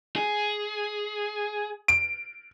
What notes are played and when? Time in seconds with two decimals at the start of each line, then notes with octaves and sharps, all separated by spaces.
0.16 G#4
1.88 D7